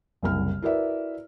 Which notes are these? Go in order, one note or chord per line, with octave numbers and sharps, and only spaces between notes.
F#1 C2 F6
E4 F#4 A#4 B4 D5 E5